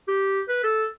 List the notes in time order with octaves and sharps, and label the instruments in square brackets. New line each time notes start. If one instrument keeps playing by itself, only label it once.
[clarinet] G4
B4
A4